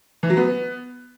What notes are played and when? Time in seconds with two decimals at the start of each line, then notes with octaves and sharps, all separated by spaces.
0.23 E3
0.30 F#3
0.37 B3